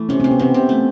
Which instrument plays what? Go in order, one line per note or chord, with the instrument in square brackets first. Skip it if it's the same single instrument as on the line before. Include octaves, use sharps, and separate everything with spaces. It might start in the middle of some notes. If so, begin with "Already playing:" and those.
Already playing: [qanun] E3 A3
[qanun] C3 [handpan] C#4
[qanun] C3 [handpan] C4
[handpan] B3
[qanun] C3 [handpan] C4
[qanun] C3
A3